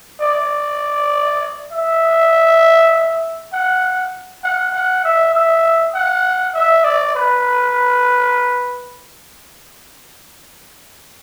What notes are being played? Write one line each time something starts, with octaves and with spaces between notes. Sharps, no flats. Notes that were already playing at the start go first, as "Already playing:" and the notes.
D5
E5
F#5
F#5
F#5
E5
E5
F#5
E5
D5
B4